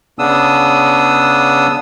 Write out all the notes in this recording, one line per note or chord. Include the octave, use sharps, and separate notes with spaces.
C#3 B3 D4 D#6 E6